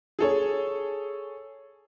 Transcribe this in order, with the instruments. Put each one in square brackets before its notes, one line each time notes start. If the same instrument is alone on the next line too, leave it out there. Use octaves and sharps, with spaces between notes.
[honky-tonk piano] G#4 A4 C#5